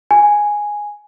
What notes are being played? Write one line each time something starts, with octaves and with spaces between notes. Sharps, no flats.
G#5